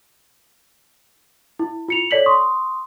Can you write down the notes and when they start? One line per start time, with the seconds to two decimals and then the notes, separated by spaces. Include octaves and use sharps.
1.59 E4
1.88 F4 C#7 F7
2.11 A4 C#5 D5 B6 F#7
2.26 C6 C#6 D#6